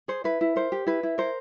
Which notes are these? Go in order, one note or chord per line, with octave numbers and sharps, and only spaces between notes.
G#4 C5
E4 B4
E4
A#4 C5
G4
E4 B4
E4
A#4 C5